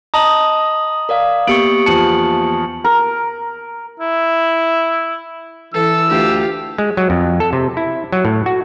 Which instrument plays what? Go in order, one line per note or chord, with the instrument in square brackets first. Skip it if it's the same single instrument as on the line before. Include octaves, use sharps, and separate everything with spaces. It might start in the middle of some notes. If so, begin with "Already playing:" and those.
[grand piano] D#5 A5 A#5 [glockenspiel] D#6 F#7
[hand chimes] A#4 D5 F5
[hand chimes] A#3 B3 G4 [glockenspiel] C#6 C#7 F#7 [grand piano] D7
[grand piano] E2 F3 C#7 [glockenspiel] A5 F#7
[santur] A#4
[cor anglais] E4
[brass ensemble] E3 [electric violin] A4 [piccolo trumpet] E6
[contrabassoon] D2 [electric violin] F4 G4
[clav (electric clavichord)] G#3
F#3
F2
A4
C3
E4
F#3
A2
F#4